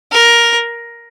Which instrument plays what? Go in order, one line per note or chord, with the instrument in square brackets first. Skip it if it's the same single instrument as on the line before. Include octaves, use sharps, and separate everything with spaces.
[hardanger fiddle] A#4